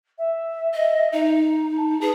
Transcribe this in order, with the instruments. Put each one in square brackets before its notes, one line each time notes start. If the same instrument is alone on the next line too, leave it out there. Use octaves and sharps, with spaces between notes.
[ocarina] E5
[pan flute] D#5
D#4
[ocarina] A5
[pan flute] G#4 [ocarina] B4